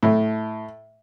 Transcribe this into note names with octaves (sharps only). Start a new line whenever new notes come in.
A2